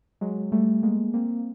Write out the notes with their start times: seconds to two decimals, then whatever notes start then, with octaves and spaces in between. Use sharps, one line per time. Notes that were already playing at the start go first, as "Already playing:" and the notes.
0.21 F#3 G#3
0.52 G3 A3
0.83 G#3 A#3
1.14 A#3 C4